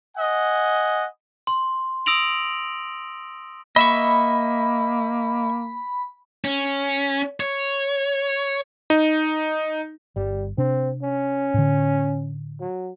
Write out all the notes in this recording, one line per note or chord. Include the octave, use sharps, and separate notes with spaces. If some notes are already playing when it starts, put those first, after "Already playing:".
D#5 F#5 G#5
C6
D#6 E6 A#6 D7 F7 F#7
A#3 D#5 E5 B5 C#6
C#4
C#5
D#4
G1 G3
C3 C4 D4
C#4
A2 D3
F#3